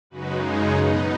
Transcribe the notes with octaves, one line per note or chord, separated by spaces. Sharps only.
F#2 C#3 G#3 D#4 F#4 B4
G#4 C#5
B2 B3 D#4 B4 D#5